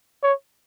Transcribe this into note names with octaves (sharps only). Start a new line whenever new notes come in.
C#5